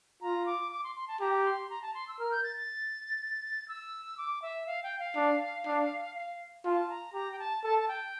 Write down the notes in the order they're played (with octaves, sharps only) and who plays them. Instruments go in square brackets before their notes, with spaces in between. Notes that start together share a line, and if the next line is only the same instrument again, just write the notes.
[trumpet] F4 [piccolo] A#5
[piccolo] D6
D6
C6
C6
A5
[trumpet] G4 [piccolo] A#5
[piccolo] C6
A#5
A5
C6
E6
[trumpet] A#4 [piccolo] F6
[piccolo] G6
A6
A6
E6
D6
E5
F5
G5
F5
[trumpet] D4
D4
[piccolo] F5
[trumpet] F4 [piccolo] A5
[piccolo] A#5
[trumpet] G4 [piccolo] A#5
[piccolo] G5
A5
[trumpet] A4 [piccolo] A5
[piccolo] A5
G5